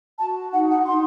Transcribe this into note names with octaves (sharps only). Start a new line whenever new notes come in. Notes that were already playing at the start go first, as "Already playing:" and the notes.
F#4 A5
D#4 F#5
F#5
D#4 C6